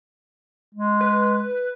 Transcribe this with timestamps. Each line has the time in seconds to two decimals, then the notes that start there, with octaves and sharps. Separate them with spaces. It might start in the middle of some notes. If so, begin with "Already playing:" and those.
0.75 G#3
1.01 B4